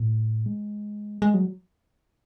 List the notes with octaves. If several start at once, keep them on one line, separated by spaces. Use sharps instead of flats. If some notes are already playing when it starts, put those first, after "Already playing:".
Already playing: A2
G#3
G#3
F#3